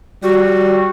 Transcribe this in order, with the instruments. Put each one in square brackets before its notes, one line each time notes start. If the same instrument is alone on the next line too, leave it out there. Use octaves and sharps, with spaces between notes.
[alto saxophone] G3 [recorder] F#4